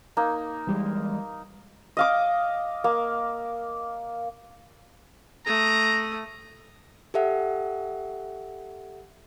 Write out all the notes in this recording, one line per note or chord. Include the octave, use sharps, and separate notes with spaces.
A#3 D#4
E3 G3 G#3
D#5 F5 D6
A#3
A3 A#5 D#6
G4 A4 E5 F#5